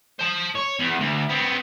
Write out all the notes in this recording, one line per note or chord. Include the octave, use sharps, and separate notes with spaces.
C5 A5
C#5
E2
D2
B3 C4